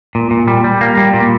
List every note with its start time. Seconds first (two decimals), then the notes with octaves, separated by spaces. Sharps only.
0.15 A#2
0.31 A#2
0.48 G3
0.64 G3
0.81 A#3
0.98 G3
1.14 A#2